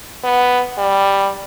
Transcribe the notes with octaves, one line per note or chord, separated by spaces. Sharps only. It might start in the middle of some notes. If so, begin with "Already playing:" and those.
B3
G3